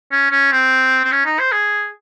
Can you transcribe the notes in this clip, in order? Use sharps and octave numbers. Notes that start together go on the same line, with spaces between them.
C#4
C#4
C4
C4
C#4
D#4
C5
G#4